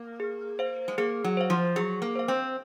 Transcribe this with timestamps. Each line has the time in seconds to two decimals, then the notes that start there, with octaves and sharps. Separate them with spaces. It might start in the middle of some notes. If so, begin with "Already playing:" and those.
Already playing: A#3
0.20 G#4
0.59 C5 F5
0.88 G#3
0.98 A#3 G#4
1.24 F#3
1.37 C5 F5
1.50 F3
1.76 F#3 G#4
2.02 A#3
2.16 C5 F5
2.28 C4